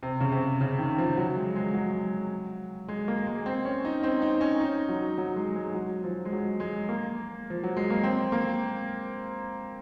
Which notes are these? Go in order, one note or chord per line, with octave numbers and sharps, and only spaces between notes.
C3
C#3
C3
C#3
D#3
F3
F#3
G#3
G#3
F#3
G#3
A#3
G#3
C4
C#4
D#4
C4
D#4
C#4
D#4
F#3
F#3
G#3
G#3
F#3
F3
G#3
F#3
G#3
A#3
F3
F#3
G#3
A#3
C4
A#3